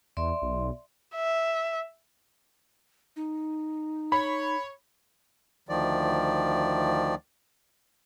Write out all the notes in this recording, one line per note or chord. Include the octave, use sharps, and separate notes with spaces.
E2 D5 E5 C6
B1
E5
D#4
C#5 B5
D2 D#3 F3 D5